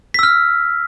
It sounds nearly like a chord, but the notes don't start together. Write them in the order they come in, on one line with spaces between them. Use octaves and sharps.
B6 E6 F6